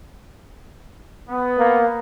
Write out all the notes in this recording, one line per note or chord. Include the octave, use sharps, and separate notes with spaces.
B3
A#3